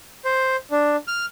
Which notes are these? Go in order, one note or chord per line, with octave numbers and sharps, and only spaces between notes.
C5
D4
F6